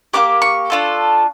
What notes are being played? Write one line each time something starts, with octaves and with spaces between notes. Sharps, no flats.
A#3 D4 G4 D6
C#6
D4 F4 A4